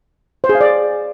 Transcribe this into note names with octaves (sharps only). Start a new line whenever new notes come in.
C5
G#4
F5
D5